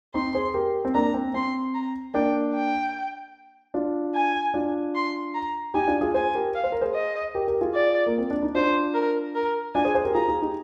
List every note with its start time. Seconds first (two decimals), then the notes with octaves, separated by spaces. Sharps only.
0.14 C4 D#4 C6
0.35 G#4 C5
0.54 G4 A#4
0.85 C4
0.95 A#3 D4 A#5
1.14 C4
1.34 C4 C6
1.74 A#5
2.14 A#3 D4 G5
2.54 G5
3.74 D4 F4
4.15 G#5
4.54 D4 F4
4.95 C6
5.34 A#5
5.74 D#4 G4 G#5
5.87 D4 F4
6.01 F4 G#4
6.14 G#4 C5 G#5
6.35 G4 A#4
6.55 F5
6.64 C5
6.72 A#4
6.81 G#4 C5
6.94 D#5
7.35 G4 A#4
7.48 G4 A#4
7.61 F4 G#4
7.74 D5
8.06 A#3
8.18 C4
8.30 D4
8.42 D#4
8.55 D4 F4 C5
8.94 A#4
9.35 A#4
9.75 D4 F4 G#5
9.85 G#4 C5
9.95 G#4 C5
10.05 G4 A#4
10.15 F4 G#4 A#5
10.28 F4 G#4
10.41 D#4 G4